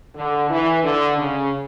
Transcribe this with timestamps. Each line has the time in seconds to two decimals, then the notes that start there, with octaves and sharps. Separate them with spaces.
0.15 D3
0.50 E3
0.84 D3
1.18 C#3